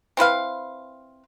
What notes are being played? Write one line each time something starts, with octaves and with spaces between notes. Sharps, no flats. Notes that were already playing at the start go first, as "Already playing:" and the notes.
C4 E4 B4 F5